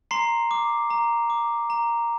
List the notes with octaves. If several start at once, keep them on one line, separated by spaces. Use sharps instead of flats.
A#5 C6 C7
D6
A#5
D6
A#5